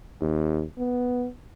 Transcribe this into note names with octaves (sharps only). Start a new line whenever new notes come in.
D#2
B3